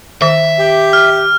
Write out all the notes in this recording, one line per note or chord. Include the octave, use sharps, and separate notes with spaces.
D#3 E5
G4
F6